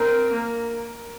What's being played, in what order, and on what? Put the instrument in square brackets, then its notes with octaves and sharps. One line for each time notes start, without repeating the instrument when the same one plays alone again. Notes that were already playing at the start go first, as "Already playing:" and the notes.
Already playing: [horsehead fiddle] C4 [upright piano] A#4
[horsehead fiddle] A#3